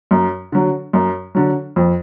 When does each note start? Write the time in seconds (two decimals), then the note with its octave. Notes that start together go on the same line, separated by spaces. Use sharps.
0.11 F#2
0.52 D3 F#3
0.93 F#2
1.35 D3 F#3
1.76 F2